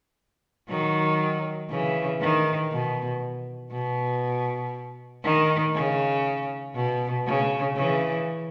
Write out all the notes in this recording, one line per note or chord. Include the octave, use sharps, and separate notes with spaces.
D#3 F#3
C#3 E3
D#3
B2
B2
D#3
C#3
B2
C#3
C#3 E3